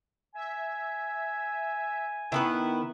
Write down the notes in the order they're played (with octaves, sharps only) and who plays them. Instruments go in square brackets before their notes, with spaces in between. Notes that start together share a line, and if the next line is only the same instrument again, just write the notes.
[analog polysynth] E5 [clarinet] G#5
[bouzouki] D#3 B3 B4 [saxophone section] E4